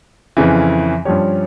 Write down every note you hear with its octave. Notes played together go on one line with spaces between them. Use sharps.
F2 C#3 E3
G2 F3 C#4 G4 C#5